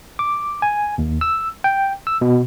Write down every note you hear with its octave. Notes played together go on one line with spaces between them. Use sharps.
D6
G#5
D#2
E6
G5
E6
B2